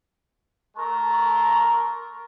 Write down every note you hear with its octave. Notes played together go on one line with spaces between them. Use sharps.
A3 A#4 A5 C6 C#6